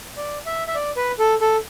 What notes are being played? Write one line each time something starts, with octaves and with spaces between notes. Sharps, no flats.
D5
E5
E5
D5
B4
A4
A4